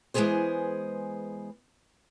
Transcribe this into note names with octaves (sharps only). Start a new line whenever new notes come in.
E3 G#3 A3 B3 G#4 C5